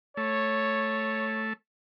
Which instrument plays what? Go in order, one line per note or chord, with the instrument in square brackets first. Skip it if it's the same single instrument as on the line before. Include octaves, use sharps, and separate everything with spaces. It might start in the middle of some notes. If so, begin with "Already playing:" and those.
[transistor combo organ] A3 [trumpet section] C#5